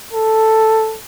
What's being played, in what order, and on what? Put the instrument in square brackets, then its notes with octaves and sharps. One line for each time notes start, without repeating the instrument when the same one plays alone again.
[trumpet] A4